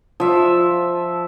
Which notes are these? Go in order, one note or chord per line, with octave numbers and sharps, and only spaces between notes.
F3 E5